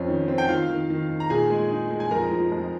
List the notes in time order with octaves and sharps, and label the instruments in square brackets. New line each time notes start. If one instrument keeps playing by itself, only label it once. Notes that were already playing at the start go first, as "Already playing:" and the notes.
Already playing: [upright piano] F2 C4 C#4
D#3
C4
G5
D#3 F4 F5
D#3
D#3
D#3
A#5
A#2 G#4 G#5
G#3
D#4
G#3
G#5
F2 A#4 A#5
F3
F2